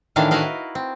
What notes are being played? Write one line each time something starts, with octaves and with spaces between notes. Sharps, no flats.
A2 D#3 E3 D4 F5 A5
E4 F#4 A#4 B4 D#5 F5
C4